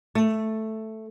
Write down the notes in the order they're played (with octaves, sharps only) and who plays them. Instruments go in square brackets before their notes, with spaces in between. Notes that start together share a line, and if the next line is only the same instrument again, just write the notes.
[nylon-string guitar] A3